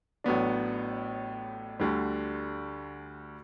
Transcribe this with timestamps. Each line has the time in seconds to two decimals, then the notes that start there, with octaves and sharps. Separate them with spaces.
0.24 A1 A2 F#3 B3 D4
1.80 D2 D3 G3